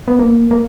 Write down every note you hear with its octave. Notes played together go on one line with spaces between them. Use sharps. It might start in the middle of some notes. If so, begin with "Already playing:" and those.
B3
A#3
A#3